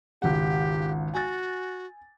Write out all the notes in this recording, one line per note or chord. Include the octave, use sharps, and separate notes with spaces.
G#1 C#2 G4 F#5
F#4 G#5 A6